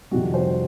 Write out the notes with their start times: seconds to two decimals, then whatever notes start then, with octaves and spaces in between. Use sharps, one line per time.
0.11 F2 C3 D#3 G3 F#4
0.34 C5